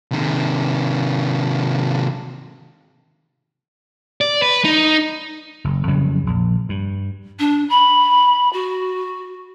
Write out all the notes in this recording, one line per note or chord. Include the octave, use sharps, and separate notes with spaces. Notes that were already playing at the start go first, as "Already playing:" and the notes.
C3 D#3
D5
B4
D#4
F#1
F2 C#3 F#3 G3
A#1
G2
D4
B5
F#4